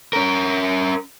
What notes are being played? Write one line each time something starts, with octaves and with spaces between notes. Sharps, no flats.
C#4 A#4